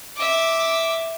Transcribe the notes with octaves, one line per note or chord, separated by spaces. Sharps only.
E5 D6